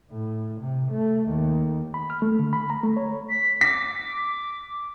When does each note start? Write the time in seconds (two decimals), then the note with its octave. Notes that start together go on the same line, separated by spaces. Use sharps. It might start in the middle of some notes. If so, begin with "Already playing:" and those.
0.10 A2
0.61 C3
0.92 A3
1.29 D#2
1.94 B5
2.10 F6
2.22 A3
2.39 D3
2.53 B5
2.70 A#5
2.83 A3
2.97 C#5
3.30 B6
3.61 D6 B6